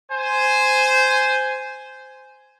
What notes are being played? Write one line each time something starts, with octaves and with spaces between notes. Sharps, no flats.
C5 G#5